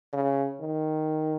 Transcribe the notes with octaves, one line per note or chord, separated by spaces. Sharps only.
C#3
D#3